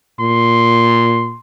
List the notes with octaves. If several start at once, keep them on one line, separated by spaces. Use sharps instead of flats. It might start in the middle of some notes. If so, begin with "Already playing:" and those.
A#2 C6